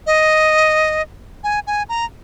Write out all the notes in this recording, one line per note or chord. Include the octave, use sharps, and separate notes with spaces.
D#5
G#5
G#5
A#5